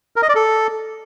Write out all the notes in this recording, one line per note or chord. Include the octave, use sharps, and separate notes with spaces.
A#4
D#5
D5
A4